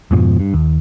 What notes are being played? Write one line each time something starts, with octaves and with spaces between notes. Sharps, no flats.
F2 G#2 B2 F3
G2
D#2